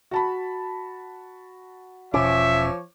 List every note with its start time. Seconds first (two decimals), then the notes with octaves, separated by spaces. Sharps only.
0.11 F#4 A5 B5
2.14 E1 B2 F3 C#4 C#5 E5 D6